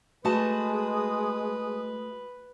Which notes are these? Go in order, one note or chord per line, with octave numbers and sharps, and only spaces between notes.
G#3 A3 F#4 B4 A5 D#6